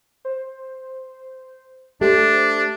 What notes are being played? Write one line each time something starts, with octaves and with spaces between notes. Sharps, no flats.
C5
A3 D4 G4 C5